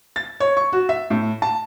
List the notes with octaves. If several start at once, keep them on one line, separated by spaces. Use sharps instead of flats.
A6
C#5
C#6
F#4
E5
A2
A5